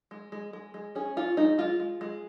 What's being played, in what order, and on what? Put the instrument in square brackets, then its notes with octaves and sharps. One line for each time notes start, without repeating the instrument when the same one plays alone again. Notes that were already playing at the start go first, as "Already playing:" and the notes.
[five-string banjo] G#3
G#3
G#3
G#3
C#4 G#4
C#4 F4
G#3 D#4
G#3 F4
G#3
G#3